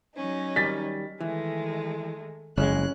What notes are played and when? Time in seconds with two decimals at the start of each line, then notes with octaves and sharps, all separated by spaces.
0.16 F#3 C#4 D#4
0.56 D#3 G3 A6 B6
1.21 D#3 E3 G#3 A3
2.58 F#1 F2 C#3 G#3 C#4 F#6